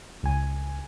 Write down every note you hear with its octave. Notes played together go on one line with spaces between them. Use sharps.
C#2 G#5